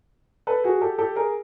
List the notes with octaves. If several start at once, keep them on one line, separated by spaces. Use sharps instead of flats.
A4 B4
F#4 G#4
G4 A4
G4 A4
G#4 A#4